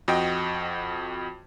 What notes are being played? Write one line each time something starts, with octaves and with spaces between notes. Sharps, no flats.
F2 F#4 D#5 G5